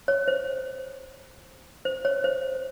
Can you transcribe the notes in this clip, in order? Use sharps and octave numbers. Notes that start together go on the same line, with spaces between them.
C#5
C5
C5
C#5
C5